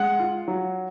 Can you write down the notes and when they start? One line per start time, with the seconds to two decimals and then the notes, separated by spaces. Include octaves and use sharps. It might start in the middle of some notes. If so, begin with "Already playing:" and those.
Already playing: G#3 F#5
0.20 F4
0.48 F#3